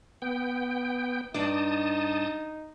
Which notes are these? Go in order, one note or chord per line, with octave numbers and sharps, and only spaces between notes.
B3 G5
G2 D4 D#4 D5 A5 D#6